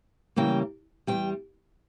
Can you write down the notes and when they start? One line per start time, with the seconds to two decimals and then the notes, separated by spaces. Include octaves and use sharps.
0.36 C#3 E3 G3 A#3 G5
1.07 C#3 G3 G5
1.11 E2